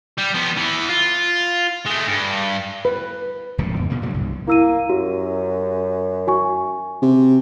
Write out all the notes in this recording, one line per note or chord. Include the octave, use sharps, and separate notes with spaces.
G3
F3 B3
E3 B3
F4
G#3 A3
G2
B4
D1 C#2 A#2 F3
F2 B2
B2 D3 A#3
A#2 C#3 F#3 G3
C2 G2
A#3 E4 E6 D#7
F#2 F#4 G4
F#4 G#5 C#6
C3